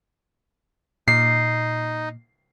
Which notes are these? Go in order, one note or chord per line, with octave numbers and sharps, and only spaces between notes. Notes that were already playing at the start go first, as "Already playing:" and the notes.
A#2 D#4 C7